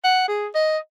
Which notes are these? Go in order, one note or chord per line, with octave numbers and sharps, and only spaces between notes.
F#5
G#4
D#5